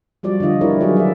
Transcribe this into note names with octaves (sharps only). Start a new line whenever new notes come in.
F3 G3 F#4 D5
D3 D#3 F4 D#5
E4 G4 A#4 B4 C#5 D5
D#3 F#3 D#4 F#4 G#4
D5 E5